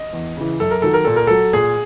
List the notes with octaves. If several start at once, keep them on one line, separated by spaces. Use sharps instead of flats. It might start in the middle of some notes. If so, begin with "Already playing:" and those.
Already playing: D#5
E2
C#3 E3
F#2 A4
A#4
D#3 F#3 A4
A#4
A#2 A4
A#4
F#3 A4
A#2 G#4